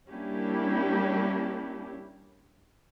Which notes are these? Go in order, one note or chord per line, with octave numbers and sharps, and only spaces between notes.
G3 A#3 C#4 D4 E4 G4